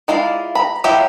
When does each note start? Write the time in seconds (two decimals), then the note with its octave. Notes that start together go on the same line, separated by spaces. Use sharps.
0.08 G#3 E4 F4 D5 F5
0.55 A#5 B5
0.84 F#3 E4 F4 G4 E5